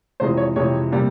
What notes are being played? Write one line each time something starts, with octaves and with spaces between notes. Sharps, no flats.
F2 C3 E3 G#3 C5
C#5
F2 C3 E3 G#3 C#5
C3 G3 A#3